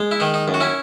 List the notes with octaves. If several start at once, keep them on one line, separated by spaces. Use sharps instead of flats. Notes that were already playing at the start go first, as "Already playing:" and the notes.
Already playing: G#3
E4
D#3 D#4
D#4
F#2
F#4
C#4 E4